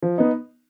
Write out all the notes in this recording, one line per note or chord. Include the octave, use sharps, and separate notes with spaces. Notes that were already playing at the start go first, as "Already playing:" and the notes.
F3
B3 D#4